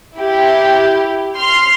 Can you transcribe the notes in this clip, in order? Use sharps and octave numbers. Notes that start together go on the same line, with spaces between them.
E4 G4
C6 F6